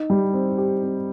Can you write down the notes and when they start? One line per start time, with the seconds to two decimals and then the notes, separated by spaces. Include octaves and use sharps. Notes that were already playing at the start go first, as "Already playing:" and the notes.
Already playing: D#4
0.10 G3
0.34 C4
0.58 G4
0.83 C4